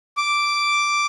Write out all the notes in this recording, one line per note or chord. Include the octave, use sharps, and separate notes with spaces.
D6